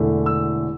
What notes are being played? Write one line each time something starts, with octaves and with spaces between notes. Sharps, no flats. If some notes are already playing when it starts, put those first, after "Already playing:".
Already playing: E1 E2 D3 A3
E6